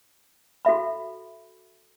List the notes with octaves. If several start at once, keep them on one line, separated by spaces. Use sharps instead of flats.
F#4 A4 E5 B5